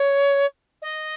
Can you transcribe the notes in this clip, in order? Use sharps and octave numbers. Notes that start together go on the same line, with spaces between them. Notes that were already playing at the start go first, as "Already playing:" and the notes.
Already playing: C#5
D#5